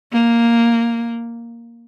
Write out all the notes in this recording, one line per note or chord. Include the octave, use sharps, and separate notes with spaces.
A#3